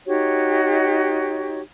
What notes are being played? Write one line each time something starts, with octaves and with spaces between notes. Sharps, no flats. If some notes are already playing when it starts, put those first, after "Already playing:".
D#4 F#4 G4 C#5